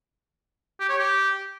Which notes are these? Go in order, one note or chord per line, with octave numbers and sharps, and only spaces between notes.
G4
C#5
G4